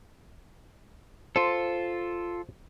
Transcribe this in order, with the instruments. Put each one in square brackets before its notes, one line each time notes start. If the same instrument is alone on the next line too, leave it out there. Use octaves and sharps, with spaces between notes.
[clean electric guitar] F4 A4 [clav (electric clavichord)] C5